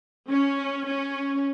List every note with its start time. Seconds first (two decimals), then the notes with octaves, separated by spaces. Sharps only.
0.28 C#4
0.86 C#4